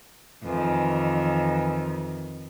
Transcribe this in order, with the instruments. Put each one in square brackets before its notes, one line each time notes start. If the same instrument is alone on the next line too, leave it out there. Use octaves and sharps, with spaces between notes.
[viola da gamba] F2 D#3 [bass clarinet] E3